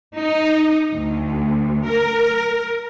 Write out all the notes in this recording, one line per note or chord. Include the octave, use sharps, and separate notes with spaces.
D#4
D2
A#4